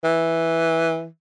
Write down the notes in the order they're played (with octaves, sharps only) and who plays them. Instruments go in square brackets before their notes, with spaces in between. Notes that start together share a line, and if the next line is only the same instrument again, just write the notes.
[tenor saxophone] E3